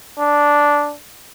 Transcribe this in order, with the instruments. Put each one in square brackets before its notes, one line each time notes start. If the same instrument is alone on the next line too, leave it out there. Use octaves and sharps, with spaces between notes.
[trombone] D4